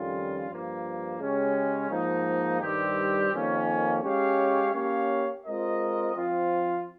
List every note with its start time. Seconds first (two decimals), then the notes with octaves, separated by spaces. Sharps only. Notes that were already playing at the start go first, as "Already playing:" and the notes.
Already playing: F2 D#3 G3 C#4 F4
0.48 G2 F3 A#3
1.18 C#3 G#3 C#4 G4
1.90 G#2 F3 A#3 D#4
2.61 G2 D#3 G3 C4 G4
3.32 F2 D#3 A#3 C#4
4.02 G#3 C#4 G4 C#5 F5
4.73 A#3 C#4 G4 C#5 F5
5.44 G#3 C4 F4 A#4 D#5
6.15 F3 C4 F4